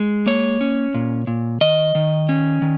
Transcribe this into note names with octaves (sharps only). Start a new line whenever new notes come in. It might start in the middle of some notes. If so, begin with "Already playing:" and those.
Already playing: G#3
A#3 C#5
C#4
A#2
A#2
D#3 D#5
D#3
C#4
D#3